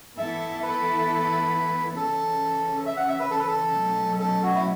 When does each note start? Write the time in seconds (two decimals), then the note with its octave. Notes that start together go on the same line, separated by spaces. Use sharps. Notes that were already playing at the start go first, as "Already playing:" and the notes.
0.17 E3 B3 E4 A4 E5
0.62 B4
1.97 C#3 E3 C#4 A4
2.86 E5
2.97 F#5
3.08 E5
3.20 B4
3.31 A4
3.39 B4
3.48 A4
3.75 B2 F#3 A3 C#4
4.20 A4
4.43 F#4
4.55 E4